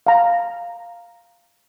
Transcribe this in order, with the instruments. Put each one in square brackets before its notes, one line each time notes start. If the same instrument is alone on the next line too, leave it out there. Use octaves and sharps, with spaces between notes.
[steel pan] F5 A#5